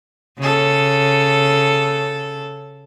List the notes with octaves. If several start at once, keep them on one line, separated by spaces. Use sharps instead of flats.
C#3 A4